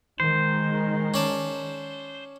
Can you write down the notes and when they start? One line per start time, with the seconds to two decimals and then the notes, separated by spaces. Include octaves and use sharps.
0.20 D#3 G#3 C5
1.14 C#4 D5 A5